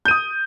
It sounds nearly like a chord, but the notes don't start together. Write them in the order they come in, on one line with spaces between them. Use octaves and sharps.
G6 D#7 D#6